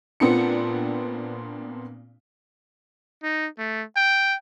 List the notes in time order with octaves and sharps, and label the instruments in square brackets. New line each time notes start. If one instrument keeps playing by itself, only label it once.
[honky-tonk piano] A#2 B3 C4 D4 C#7
[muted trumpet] D#4
A3
G5